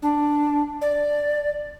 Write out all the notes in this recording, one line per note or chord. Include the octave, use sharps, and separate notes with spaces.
D4
D5